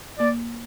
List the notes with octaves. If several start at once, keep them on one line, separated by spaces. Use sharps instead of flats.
A#3 D5